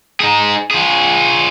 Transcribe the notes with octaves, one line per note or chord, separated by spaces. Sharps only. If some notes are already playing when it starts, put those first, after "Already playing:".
D#4 G#4
F4 G#4